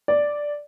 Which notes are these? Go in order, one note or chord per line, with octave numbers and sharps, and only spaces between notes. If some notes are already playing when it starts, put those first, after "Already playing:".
D5